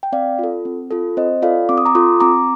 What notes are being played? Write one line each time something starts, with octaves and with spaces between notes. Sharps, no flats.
G5
C4 D5 F5
F4 A4
C4
F4 A4
C4 C5 D#5
F4 A4 D5 F5
C4 D6
D#6
A#5 D6
F4 A4 C6 D#6
C4 A#5 D6